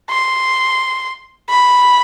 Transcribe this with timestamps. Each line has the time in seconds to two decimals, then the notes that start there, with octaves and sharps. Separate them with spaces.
0.10 C6
1.50 B5